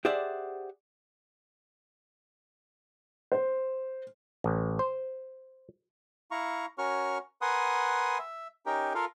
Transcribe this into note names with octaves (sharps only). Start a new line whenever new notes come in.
G4 G#4 C5 D5 E5 F#5
C5
A1
C5
E4 F5 A#5 C#6
C#4 F#4 A#4 C#5 C#6 F6
A#4 B4 F#5 G#5 C6 D#6
E5
C#4 D#4 G4 A#4 G5
F4 A4 A#4 F5